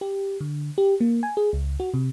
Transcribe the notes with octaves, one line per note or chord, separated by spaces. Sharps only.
G4
D3
G4
A#3
G#5
G#4
C#2
F#4
C3